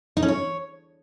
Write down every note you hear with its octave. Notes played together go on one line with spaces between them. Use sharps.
D#4
C#4
C#5